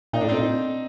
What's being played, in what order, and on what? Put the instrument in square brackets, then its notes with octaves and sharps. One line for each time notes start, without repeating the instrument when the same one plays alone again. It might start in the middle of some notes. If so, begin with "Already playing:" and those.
[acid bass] A#2 [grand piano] D#4
[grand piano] D4
[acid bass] A2
[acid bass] A#2 [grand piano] C4 D#4